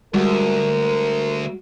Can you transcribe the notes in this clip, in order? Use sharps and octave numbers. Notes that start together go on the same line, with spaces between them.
D2 G3 G#3 F#4 A#4